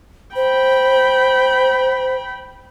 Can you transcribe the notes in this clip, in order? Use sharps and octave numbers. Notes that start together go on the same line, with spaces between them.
C5 G5 B5